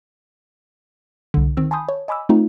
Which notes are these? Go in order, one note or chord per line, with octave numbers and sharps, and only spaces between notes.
C2 D3
D#3 C4 E6
G#5 A5 B5 C6 D#6 G6
C#5
D#5 G#5 B5 D6 E6
A3 C4 D#4 F4